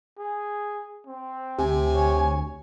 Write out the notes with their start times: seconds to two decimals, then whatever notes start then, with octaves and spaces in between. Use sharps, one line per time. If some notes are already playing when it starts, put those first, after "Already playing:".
0.18 G#4
1.06 C4
1.59 D2 C3 G#5
1.94 C#5